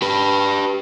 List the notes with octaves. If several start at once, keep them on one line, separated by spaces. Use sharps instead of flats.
G4 B4